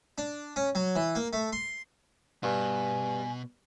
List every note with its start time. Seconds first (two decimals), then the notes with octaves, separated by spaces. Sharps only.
0.18 D4
0.56 C#4
0.75 F#3
0.96 E3
1.15 A#3
1.33 A3
1.53 C6
2.43 G2 B2 G#5